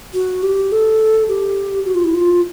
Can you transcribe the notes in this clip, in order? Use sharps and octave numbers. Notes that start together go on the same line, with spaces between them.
F#4
G4
A4
G4
F#4
F4
E4
F4